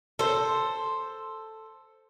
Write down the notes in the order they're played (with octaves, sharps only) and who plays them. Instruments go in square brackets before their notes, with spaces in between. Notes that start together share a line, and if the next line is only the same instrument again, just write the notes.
[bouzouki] A4 C5